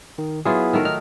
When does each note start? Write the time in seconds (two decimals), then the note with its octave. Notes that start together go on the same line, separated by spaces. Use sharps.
0.18 D#3
0.45 F#3 B3 E4 F4 G#4
0.73 D#3 A3 A#4
0.85 D#4 F6